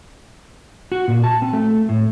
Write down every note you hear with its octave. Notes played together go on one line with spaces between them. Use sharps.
F#4
A#2
A5
C4
A3
A2